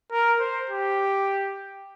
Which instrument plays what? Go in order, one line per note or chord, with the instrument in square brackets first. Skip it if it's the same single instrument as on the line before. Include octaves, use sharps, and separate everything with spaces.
[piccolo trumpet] A#4
C5
G4